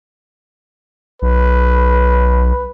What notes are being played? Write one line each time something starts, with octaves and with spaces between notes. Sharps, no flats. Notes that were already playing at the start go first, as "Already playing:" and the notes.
B1 B4